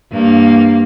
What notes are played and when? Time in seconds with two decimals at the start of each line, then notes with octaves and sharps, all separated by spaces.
0.12 G2 A#3